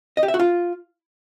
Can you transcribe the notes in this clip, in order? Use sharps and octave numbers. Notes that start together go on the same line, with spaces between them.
D#5
G4
E5
F#4
F4